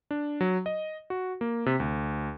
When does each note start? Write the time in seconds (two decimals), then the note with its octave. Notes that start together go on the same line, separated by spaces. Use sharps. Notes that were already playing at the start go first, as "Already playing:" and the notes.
0.11 D4
0.41 F#3
0.66 D#5
1.10 F#4
1.41 A#3
1.66 C3
1.80 D2